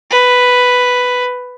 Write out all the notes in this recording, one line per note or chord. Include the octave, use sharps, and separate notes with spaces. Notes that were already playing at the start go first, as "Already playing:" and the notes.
B4